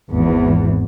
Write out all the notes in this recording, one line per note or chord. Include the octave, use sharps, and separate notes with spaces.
G#1 E2